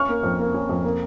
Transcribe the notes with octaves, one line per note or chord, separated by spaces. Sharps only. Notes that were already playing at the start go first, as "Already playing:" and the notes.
Already playing: C#4 C#6 F6
A#3
F2
A#3
C#4
F2
A#3